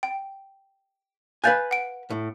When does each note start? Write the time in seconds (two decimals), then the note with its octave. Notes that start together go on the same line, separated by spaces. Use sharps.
0.03 G5
1.44 B4 F5 G#5 F#6 G6 A6
1.71 F#5 D7
2.10 A2